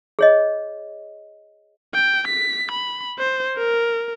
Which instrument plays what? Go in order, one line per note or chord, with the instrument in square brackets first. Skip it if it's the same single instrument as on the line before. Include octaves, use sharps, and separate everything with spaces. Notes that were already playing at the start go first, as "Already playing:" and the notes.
[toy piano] G#4 C#5 D#5
[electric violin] G5
B6
B5
C5
A#4